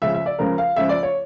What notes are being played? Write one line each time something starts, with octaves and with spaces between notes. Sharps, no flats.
C#2 C#3 F3 E5
E5
D5
C#2 C#3 F3 A#4
F5
C#2 C#3 F3 E5
D5
C#5